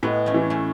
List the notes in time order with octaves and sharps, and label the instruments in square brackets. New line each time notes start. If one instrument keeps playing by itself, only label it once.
[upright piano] A2 [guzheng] G#3 B3
[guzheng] A3 C#4
[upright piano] E3
[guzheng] A3 C#4